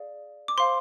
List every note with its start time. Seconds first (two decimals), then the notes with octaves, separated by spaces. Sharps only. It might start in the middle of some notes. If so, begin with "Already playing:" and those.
Already playing: G#4 D5 F5
0.48 D6
0.58 C5 F5 C6